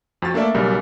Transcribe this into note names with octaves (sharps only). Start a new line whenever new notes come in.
F2 C4 F#4 A6
A3 A#3 D4 A4 D5 E5
B1 C#3 G3 A#4